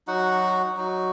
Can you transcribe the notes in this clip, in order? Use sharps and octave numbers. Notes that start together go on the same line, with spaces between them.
F#3 D#4 F#4 F#5
F#3 D#4 F#4